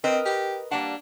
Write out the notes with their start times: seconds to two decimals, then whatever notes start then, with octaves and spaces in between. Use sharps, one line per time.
0.04 C4 A#4 B4 D#5
0.25 G4
0.71 G3 A#3 D4 F#5